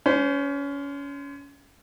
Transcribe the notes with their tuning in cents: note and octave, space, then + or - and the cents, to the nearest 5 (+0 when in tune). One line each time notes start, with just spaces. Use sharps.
C#4 +25 C5 -25